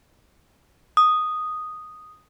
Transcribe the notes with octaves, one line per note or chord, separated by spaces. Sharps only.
D#6